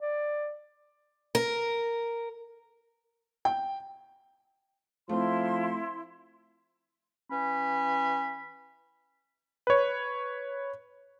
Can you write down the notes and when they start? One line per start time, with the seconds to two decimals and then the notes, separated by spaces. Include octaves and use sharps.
0.01 D5
1.35 A#4
3.45 G5
5.09 F3 A3 C4 E4 C6
7.30 E3 C#4 B5
9.67 B4 C#5